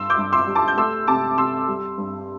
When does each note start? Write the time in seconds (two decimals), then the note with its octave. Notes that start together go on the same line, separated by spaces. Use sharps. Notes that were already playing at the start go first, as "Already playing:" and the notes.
Already playing: G2 C6 E6
0.10 D6 G6
0.18 G2
0.33 C6 E6
0.47 G3
0.55 A5 D6
0.68 G6
0.78 A3 C6 E6
1.07 C3 A5 D6
1.38 C3 C6 E6
1.68 G3
1.98 G2